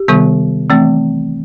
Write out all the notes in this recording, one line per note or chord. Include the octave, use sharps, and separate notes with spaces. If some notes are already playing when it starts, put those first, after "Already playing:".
Already playing: G4
C3 D#3 G3 B3
E3 A3 C4